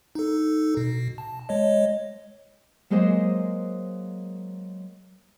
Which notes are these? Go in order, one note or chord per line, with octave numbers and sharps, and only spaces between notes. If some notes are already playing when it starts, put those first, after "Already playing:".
D#4 A4
B2
A5
G#3 C#5 D#5
F#3 G#3 A#3 G#4 C5 D#5